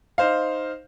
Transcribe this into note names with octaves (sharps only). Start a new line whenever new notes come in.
D#4 C5 F5